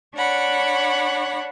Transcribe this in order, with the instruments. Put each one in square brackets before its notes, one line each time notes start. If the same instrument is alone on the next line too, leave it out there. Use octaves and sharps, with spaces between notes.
[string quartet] D4 C#5 F#5 B5